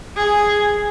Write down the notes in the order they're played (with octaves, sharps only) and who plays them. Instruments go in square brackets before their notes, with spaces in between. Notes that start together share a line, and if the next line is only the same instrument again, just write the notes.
[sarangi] G#4